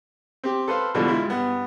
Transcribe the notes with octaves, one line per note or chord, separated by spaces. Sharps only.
C4 G4
A4 B4 C5 F5
G#2 B2 D3 E3 F3 G3
G#3 E4 F4
G2 B3